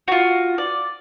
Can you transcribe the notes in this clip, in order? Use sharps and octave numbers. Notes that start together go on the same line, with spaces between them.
F4 F#4
D5